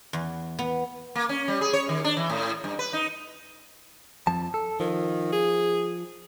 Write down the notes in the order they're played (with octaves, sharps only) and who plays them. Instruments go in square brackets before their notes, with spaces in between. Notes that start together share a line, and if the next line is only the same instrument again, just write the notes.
[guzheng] E2
B3
[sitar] A#3
C#4
G3
G#4
C#5
D#3
D4
E3
A2
G2
B4
D#4
[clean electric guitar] F2 F3 A5
A4
[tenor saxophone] D#3 [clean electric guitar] F3
[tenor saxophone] G#4